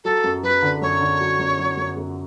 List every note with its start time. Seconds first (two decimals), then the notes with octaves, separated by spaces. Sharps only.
0.04 F#3 A4
0.24 F#2
0.43 F#3 B4
0.62 D3
0.82 F#2 C#5
1.01 D3
1.21 F#3
1.39 F#2
1.59 F#3
1.77 F#2
1.97 F#2